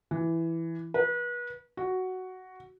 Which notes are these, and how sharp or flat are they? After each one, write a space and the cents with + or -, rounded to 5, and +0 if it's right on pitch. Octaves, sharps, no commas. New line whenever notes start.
E3 +5
B4 -35
F#4 +5